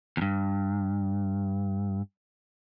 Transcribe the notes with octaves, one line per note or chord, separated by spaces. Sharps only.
E2 G2